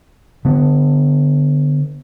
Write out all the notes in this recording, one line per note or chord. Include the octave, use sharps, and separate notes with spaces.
D3 B3